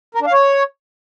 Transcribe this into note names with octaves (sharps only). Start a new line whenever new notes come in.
A#4
D4
F5
C#5